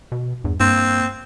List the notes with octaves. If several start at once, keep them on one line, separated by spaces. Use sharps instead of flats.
B2
E2 G2
G2 A#3 C4